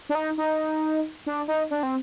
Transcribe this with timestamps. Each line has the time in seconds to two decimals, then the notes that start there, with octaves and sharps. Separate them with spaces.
0.09 D4
0.15 D#4
0.38 D#4
1.26 D4
1.48 D#4
1.71 D4
1.83 C4